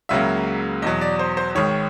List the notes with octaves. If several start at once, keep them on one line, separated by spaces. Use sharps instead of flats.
C#2 C#3 F#3 A#3 E5
E2 B2 F#3 D#5
D5
C5
C5
G#1 G#2 D#3 C#5